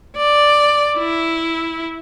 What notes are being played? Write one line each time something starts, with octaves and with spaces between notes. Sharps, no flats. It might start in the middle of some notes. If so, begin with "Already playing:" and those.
D5
E4